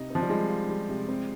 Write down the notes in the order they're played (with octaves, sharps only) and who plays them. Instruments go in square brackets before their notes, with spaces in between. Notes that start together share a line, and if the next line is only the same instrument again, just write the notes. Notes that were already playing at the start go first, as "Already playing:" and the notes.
Already playing: [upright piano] C3 C4 [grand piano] D#4
[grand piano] F3 [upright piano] C4
[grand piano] G3
[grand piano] G#3 [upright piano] F4
[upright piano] F4
G3
C3
C4